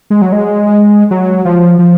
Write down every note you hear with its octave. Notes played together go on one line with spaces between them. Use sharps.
G#3
F#3
G#3
F#3
F3
F3